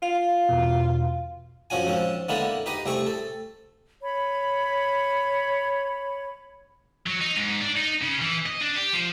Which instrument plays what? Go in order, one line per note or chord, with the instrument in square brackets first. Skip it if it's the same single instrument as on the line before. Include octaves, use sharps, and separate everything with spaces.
[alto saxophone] F4 [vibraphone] F5
[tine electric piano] E2 B2
[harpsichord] F#2 F3 C#4 F#4 G#5
G#2 F3 C4 C#4
D3 G#3 A#3 B3 E4 A4
D#4 G4 B4 D#5
C2 A3 C4 G#4 G5 C#6
A4
[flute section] C#5 B5
[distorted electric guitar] F#3
D#4
G#2
D4
D#4
C#3
E3
D#5
D4
G4
F3